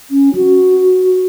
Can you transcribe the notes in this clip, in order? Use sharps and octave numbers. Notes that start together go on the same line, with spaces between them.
C#4
F#4